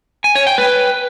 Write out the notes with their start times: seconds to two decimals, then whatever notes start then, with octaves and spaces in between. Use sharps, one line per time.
0.24 G#5
0.35 C#5
0.47 G5
0.58 B4